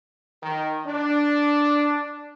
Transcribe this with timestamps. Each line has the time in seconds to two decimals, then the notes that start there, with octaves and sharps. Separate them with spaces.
0.42 D#3
0.87 D4